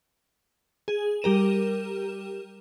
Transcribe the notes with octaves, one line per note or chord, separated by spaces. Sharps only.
G#4
G3 G4 A#4 D#7 E7